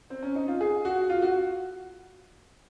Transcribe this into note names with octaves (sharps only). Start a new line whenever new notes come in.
C4
C#4
D#4
F4
G#4
F#4
F4
F#4